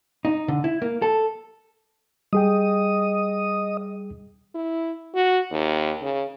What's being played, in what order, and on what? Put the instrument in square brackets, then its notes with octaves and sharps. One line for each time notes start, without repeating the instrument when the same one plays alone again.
[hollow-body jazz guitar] D#4
D3
E4
A#3
A4
[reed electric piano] G3 G#4 G5 [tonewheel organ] D#5 D#6
[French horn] E4
F#4
D#2
C#3